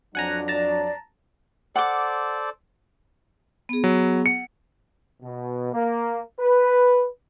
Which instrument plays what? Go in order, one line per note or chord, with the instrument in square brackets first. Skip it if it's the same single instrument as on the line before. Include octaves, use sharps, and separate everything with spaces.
[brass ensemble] F2 F#3 D4 [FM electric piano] F#5 G#5 A#5
[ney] D5 [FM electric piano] A5 A#5
[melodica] A4 C5 D5 [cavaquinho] F#5 D6
[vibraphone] B3 G#4
[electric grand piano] F#3
[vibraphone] F#5 [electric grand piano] C#7
[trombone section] B2
A#3
B4